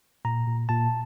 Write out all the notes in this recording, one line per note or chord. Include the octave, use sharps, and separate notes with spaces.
A#2 A#5
A#2
A#2 A5